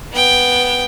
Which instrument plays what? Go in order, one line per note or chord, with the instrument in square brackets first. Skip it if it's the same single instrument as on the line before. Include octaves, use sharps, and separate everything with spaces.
[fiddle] B3 G5